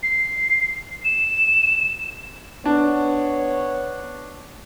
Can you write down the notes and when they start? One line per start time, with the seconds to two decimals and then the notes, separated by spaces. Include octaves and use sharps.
0.03 C7
1.05 E7
2.66 B3 D4 C#5